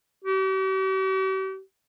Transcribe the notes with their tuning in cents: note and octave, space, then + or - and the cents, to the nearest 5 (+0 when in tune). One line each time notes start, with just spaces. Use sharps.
G4 -45